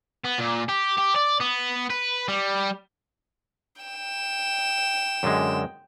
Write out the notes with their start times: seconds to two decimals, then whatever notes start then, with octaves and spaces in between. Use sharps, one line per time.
0.24 B3
0.38 A#2
0.69 G4
0.98 G4
1.16 D5
1.40 B3
1.90 B4
2.28 G3
3.82 G5 E7
5.23 F#2 D3 G#3